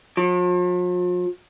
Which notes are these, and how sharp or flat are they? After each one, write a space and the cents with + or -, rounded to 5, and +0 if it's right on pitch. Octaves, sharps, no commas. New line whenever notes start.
F3 +45